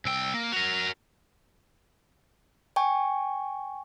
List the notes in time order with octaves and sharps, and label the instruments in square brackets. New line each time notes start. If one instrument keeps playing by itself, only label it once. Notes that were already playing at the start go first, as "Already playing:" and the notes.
[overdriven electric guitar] C2 G5 [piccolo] E6
[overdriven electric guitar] A#3
[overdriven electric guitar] F#4 A#4 [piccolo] F7
[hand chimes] G5 G#5 C#6